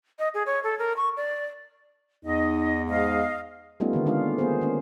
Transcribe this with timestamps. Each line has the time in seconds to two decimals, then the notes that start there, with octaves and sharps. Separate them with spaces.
0.19 D#5
0.34 G#4
0.46 C#5
0.63 A4
0.79 A#4
0.97 C#6
1.17 D5
2.25 E2 D#4 D#5
2.88 G#2 D#5 F5
3.80 G3 A3 B3 C#4 D#4 F4
3.93 D3 D#3 A#3
4.06 G#3 D4 F4 F5
4.38 A#3 B3 G#4 C5
4.62 A#3 C#4